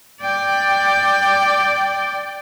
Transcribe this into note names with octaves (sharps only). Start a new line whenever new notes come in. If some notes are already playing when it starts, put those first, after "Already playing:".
D5 G5